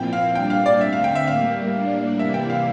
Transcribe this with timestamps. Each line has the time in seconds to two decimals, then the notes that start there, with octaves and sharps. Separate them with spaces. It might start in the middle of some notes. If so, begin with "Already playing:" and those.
Already playing: A#2 F3 C4 E4 G5
0.13 F5
0.35 A#2 G3 D4 G5
0.50 F5
0.66 D5
0.81 D3 A3 C4 E5
0.93 F5
1.04 G5
1.15 E5
1.27 A2 G3 A#3 F5
1.73 A2 G3 A#3 D4
2.19 C3 E3 G3 A#3 E4 E5
2.34 G5
2.50 F5